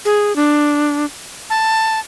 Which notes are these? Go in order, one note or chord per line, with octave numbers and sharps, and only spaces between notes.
G#4
D4
A5